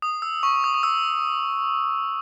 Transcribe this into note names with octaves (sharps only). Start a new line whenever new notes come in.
D#6
E6
C#6
D#6
D#6
E6